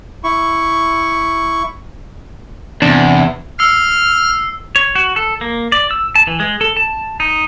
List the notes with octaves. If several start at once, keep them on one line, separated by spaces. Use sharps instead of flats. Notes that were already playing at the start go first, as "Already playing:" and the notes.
E4 C#6
E2 C3 D4
E6 F6 C7
C#5
F#4
A4
A#3
D5
E6
A5
E3
G#3
A4
A5
D#4